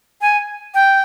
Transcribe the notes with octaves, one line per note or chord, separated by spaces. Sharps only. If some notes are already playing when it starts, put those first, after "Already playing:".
G#5
G5